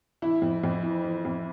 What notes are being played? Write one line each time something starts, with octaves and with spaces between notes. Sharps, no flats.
E3 E4
F2
F2
E3
E3
F2